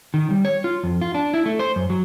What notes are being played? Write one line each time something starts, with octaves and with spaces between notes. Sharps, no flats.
D#3
G3
C#5
F4
F2
F4
D4
E4
A3
C5
F#2
F#3